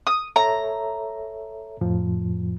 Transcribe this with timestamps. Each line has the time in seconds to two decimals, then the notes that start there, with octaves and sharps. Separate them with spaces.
0.07 D#6
0.36 A4 C#5 E5 A#5
1.81 F2 A2 F3